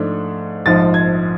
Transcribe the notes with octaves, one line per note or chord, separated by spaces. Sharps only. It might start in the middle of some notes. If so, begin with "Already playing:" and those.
Already playing: G#2 F3 A3 D4
A#1 G#2 F3 A6
G#6